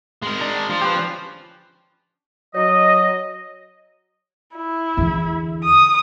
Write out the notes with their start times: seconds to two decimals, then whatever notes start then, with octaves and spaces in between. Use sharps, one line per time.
0.22 G#3 A#4
0.41 D4
0.70 F3
0.81 G4 B4
0.96 C#4 D4 G4
2.54 F#3 C#5 D#5
4.55 E4
4.97 E2 D3
5.65 D#6